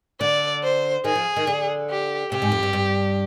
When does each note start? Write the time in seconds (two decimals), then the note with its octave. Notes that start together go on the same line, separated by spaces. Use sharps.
0.21 D3 D5
0.63 C5
1.04 D#3 G#4
1.15 F3
1.36 D#3
1.47 D3
1.90 G4
2.31 C3 G4
2.42 G#2
2.52 F2
2.63 G2
2.73 G2